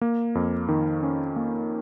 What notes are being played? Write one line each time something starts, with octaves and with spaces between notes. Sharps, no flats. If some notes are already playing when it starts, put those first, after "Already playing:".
A#3
F2
D#3
C#4
A#3